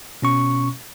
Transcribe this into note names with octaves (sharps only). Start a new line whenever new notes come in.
B2 C#4 C#6